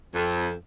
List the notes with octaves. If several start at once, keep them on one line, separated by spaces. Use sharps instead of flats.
F2